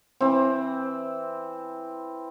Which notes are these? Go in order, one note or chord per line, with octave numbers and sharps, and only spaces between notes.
E3 C4